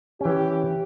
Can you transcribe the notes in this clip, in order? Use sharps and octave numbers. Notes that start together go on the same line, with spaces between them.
E3 C#4 G4